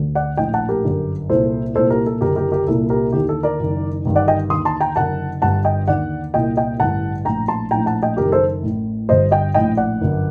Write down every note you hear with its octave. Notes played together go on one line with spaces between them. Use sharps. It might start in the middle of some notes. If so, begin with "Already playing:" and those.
Already playing: D2 D3
D5 F#5
A#1 A2 D#5 G5
F#5 A5
G4 A#4
G1 F#2 D3
C2 A#2 A4 C5
C2 A#2 A4 C5
G4 A#4
A4
F#1 F#2 D3 G4 A#4
G4 A#4
G4 A#4
C2 A#2 A4
G4 A#4
D#2 D3 G4
A4
A#4 D5
F#1 F#2 D#3
G1 G2 D#3
D5 F#5
D#5 G5
D#2 D3 C6 D#6
A5 C6
G5 A#5
F#1 F#2 D3 F#5 A5
G1 G2 D3 F#5 A5
D#5 G5
D#2 D3 D5 F#5
C2 A#2 D#5 G5
D#5 G5
A1 G2 D3 F#5 A5
A#1 A2 G5 A#5
A5 C6
A#1 A2 G5 A#5
F#5 A5
D#5 G5
F#1 F#2 D#3 G4 A#4
A4 C5
A1 A2
G1 G2 D3 C5 D#5
D#5 G5
A#1 A2 D#5 G5
D5 F#5
G1 F#2 D3